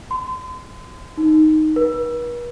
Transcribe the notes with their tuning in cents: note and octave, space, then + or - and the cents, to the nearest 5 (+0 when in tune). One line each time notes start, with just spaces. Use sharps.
C6 -40
D#4 +0
B4 -45